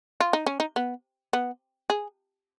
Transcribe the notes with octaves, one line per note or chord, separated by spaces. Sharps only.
F4
D#4
C#4
D#4
B3
B3
G#4